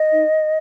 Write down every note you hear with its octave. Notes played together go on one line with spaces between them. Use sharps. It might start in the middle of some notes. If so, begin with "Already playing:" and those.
Already playing: D#5
D#4